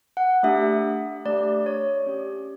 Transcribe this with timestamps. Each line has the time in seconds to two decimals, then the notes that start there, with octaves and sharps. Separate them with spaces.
0.17 F#5
0.43 A3 D4 G4 E5
1.25 A3 D4 G4 D5
1.66 C#5
2.07 C#4 G4